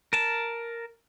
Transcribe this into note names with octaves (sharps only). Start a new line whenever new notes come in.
A#4 A5